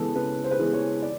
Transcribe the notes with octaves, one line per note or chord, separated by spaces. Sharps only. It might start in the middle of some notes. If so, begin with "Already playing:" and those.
Already playing: C#3 E3 G#3 B3 A4
C#3 B4
C5
B4
E3 G#3 B3 C5
C#5
D5